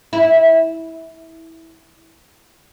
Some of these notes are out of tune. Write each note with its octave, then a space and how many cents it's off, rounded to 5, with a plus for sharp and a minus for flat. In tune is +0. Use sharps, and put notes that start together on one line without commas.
E4 -15